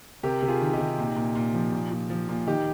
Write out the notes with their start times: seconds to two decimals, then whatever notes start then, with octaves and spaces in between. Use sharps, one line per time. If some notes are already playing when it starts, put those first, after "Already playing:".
0.23 C3 G4 A#4
0.42 C3
0.48 F4 G#4
0.61 D#3
0.73 D#4 G4
0.79 C3
0.98 A#2
1.16 A#2
1.35 A#2
1.54 F3
1.72 A#2
1.91 A#2
2.10 F3
2.29 A#2
2.47 D#3 D#4 G4